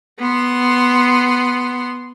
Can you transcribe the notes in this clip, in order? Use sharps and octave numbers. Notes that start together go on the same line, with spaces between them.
B3 C6